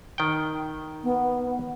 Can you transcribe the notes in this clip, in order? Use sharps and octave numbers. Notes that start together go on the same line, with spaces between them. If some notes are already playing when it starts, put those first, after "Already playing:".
D#3 G5
B3